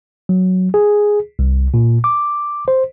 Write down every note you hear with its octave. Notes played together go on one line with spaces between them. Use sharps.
F#3
G#4
C2
A#2
D6
C5